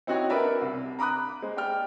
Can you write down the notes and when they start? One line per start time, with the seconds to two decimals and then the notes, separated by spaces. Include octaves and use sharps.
0.07 C4 D#4 E4 F#4 G4 C#5
0.30 D4 A#4 B4 D5 E5
0.61 C2
0.99 A#5 B5 D6 D#6 F#6
1.42 G#3 C5
1.57 G4 D5 G5 F6